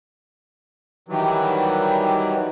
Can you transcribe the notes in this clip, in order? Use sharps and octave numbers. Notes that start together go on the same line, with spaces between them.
D#3 E3 F#3 G3